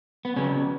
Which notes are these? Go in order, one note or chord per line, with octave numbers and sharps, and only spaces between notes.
B3
C#3 F#3 B3 C#4